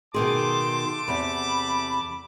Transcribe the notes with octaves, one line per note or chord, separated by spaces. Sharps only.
B2 D#3 A3 G#4 A5 C6 D6
E2 C3 B5